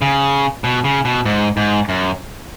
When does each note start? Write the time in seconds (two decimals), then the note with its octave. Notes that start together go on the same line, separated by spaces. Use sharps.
0.02 C#3
0.64 B2
0.84 C#3
1.05 B2
1.25 G#2
1.57 G#2
1.89 F#2